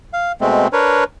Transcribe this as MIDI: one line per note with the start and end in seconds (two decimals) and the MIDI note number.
0.13 0.32 77
0.41 0.67 47
0.41 0.67 56
0.41 0.67 57
0.41 0.67 60
0.73 1.04 62
0.73 1.04 70
0.73 1.04 71
0.73 1.04 73